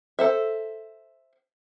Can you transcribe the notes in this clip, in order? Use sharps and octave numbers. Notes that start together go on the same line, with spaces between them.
A4 C5 E5